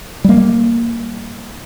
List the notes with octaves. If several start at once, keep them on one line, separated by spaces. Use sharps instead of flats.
G3 A#3